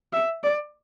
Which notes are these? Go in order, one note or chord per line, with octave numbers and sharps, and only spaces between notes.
E5
D5